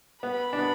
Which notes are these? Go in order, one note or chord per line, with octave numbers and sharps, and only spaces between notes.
B3 B5
D4
B3